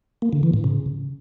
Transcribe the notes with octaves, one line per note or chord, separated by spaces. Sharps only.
A#3
D3
E3
A2
C#3